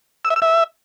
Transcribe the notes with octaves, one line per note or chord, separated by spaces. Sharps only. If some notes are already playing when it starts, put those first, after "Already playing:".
E6
E5
E6
E5